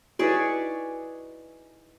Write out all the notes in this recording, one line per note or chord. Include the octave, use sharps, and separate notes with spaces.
D#4 E4 F#4 G#4 B4 C#5 D5